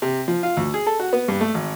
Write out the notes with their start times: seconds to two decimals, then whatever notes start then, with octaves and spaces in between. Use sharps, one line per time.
0.02 C3
0.28 F3
0.43 F4
0.57 D2
0.74 G#4
0.87 A4
1.00 F#4
1.13 B3
1.28 G2
1.41 A3
1.54 G#1